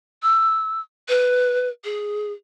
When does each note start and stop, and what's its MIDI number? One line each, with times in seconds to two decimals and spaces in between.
0.23 0.81 88
1.09 1.69 71
1.84 2.32 68